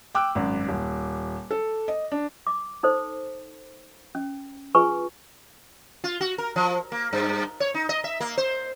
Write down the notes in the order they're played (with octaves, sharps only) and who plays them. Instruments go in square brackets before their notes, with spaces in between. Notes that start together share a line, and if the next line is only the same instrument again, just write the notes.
[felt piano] G5 D6 E6 F#6
G#1 F#2
D#1
A4
D#5
D4
[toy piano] D6
D#4 A4 C5
C#4
F4 G#4 B4 G#5 C#6
[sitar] F4
F#4
A#4
F3
A#3
G2
C#5
D#4
D#5
E5
A#3
C5